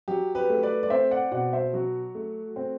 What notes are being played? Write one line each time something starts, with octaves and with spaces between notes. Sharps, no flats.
F#3 G4
G4 B4
A3
B4 D5
D5
C4 C5 E5
D5 F#5
B2 D5 F#5
C5 E5
F#3 F#4
A3
C4